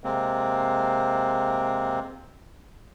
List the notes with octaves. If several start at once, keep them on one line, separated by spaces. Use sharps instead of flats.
C3 G#3 A#3 C4